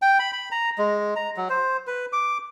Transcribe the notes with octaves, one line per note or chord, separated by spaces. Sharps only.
G5
B5
B5
A#5
G#3
A#5
F#3
C5
B4
D6